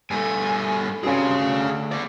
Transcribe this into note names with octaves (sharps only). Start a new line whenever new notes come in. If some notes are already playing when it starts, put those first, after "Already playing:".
G2 A3 G#5
G2 C3 C#4 F#4 G#4 F5
D2
G#4 D5